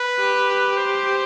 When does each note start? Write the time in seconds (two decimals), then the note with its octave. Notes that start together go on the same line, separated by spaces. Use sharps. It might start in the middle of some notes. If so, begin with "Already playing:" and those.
Already playing: B4
0.21 G4
0.77 C5